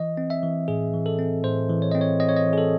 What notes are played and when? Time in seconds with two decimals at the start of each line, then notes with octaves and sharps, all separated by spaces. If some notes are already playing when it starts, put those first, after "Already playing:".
Already playing: E3 D#5
0.17 C4
0.30 E5
0.43 E3
0.68 A2 G#4
0.94 E3
1.06 A4
1.19 C4
1.44 A2 C5
1.69 E3
1.82 C#5
1.92 C4 D#5
2.01 C#5
2.20 C4 D#5
2.29 C#5
2.36 D#5
2.46 E3
2.53 G#4
2.58 A4